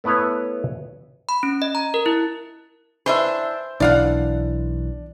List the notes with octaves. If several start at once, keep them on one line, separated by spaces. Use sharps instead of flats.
A3 B3 E4 B4 C#5
B5
C#4
D#5
A#5
A#4
E4
E3 D4 C5 E5
B1 E3 D4 D5 F5 F#5